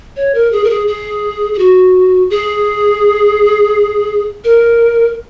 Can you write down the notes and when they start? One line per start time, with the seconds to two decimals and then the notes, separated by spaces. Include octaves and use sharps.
0.16 C#5
0.35 A#4
0.52 G#4
0.64 A#4
0.70 G#4
0.87 G#4
1.54 G#4
1.59 F#4
2.30 G#4
4.44 A#4